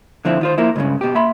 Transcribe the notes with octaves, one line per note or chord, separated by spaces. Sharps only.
D3 F3 C4 E4
D#3 F4 C5
F3 A#3 E4
C#2 G2 A#2 C#3
B2 G4
A#3 E5 B5 C6